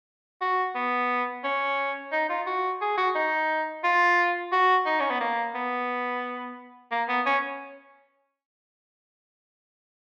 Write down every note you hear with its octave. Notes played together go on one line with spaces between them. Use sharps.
F#4
B3
C#4
D#4
F4
F#4
G#4
F#4
D#4
F4
F#4
D#4
C#4
B3
A#3
B3
A#3
B3
C#4